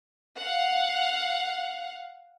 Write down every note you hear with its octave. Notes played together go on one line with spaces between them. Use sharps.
F5 F#5